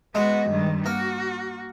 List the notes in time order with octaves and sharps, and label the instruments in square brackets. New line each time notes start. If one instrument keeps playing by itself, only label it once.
[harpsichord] G#3 [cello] B3 F#4
[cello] G2 D#3
[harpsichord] A#3 [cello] F#4